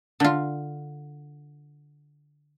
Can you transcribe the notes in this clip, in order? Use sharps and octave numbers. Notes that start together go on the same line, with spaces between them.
D3 F4